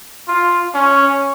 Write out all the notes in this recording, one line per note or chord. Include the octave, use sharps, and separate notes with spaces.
F4
C#4